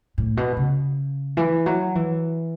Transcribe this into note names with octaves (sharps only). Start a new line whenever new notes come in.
A2
B2
C#3
E3
F#3
E3